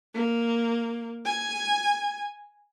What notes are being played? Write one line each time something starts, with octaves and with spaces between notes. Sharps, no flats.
A#3
G#5